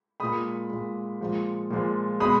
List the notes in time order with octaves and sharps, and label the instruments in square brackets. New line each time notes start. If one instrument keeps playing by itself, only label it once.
[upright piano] A#2 G#3 B5 D#6
A#2 G#3
A#2 F3 G#3
A#2 F3 G#3
B2 G#3 B5 D#6